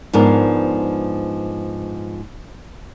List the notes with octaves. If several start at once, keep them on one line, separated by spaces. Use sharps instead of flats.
G#2 F3 B3 D4 A#4